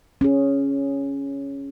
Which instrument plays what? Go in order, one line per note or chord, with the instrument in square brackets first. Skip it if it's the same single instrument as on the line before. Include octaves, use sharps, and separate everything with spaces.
[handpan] C#4 G#4